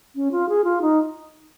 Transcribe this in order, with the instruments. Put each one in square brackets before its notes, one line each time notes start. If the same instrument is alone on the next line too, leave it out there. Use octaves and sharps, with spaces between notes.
[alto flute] C#4
F4
G#4
F4
D#4